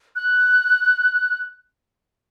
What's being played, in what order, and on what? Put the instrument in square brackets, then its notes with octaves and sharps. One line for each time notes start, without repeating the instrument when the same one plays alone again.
[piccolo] F#6